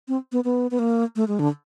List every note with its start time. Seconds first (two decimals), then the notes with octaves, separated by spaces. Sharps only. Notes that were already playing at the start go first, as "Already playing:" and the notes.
0.08 C4
0.32 B3
0.44 B3
0.71 B3
0.79 A#3
1.16 A3
1.28 G#3
1.39 D3